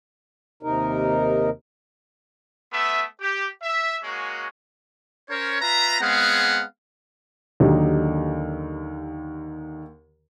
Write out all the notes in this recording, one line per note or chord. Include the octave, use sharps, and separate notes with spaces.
D#2 C3 D#4 A#4
A3 B3 E5
G4
E5
G#3 A#3 C#4 F#4
C#4 A#4 C5 C#5
F4 B4 E5 A#5
G#3 B3 C4 G#4 F5 F#5
D#2 D3 F#3 D#4 G4